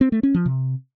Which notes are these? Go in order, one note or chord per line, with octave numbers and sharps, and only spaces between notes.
C4
A3
C#4
F3
C3